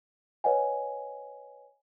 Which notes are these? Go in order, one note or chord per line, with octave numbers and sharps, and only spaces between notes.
B4 C#5 D#5 F#5 G#5